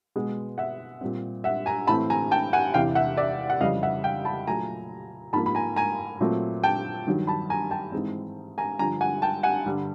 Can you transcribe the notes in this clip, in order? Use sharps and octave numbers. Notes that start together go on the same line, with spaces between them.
B2 G#3 B3
E5 F#5
A#2 G3 C4
E5 F#5
G#5 A#5
A2 E3 A3 C4 A5 B5
G#5 A#5
G5 A5
F#5 G#5
E2 C3 E3 F5 G5
E5 F#5
D5 E5
F#5
F2 C#3 E3 G3 D#5 F5
E5 F#5
F5 G5
A5 B5
A#2 F#3 A3 G#5 A#5
G#2 F3 A#3 A5 B5
B5
G#5 A#5
G#5 A#5
A#2 F#3 A3 C4
G5 A5
G2 D#3 F#3
A5 B5
G#5 A#5
G5 A5
G#2 E3 G#3 C4
G#5 A#5
G2 D3 F3 G#5 A#5
F#5 G#5
G5 A5
F#5 G#5
G2 D3 G3